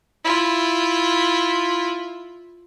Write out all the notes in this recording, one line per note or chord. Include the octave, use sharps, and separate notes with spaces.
E4 F4